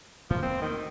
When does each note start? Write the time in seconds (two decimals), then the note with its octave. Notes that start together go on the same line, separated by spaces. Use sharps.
0.30 G#2 F3
0.42 E1 A#3 C4
0.62 D2 D#3